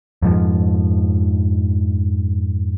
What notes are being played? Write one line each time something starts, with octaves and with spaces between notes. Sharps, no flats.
F2 G#2 F3